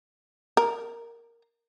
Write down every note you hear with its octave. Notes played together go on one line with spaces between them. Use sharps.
A#4